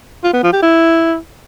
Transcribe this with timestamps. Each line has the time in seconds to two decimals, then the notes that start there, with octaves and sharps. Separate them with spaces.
0.24 F4
0.33 B3
0.43 F3
0.53 G4
0.62 E4